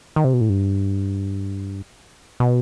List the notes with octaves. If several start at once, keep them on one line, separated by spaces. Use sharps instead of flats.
D#3
C3
B2
A2
G2
B2